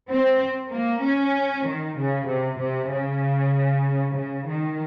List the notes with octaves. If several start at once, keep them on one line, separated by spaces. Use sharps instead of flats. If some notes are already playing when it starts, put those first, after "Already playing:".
C4
A#3
C#4
D#3
C#3
C3
C3
C#3
C#3
D#3